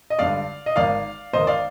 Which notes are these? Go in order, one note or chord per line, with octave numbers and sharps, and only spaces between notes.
D#5
G#1 G2 D3 D5 F5
D#5
G#1 G#2 D#3 D5 F5
G#1 G#2 D#3 C5 D#5
D5 F5